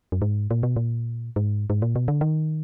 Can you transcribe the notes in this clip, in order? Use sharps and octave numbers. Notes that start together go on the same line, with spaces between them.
F#2
G#2
A#2
B2
A#2
G#2
G#2
A#2
B2
D3
D#3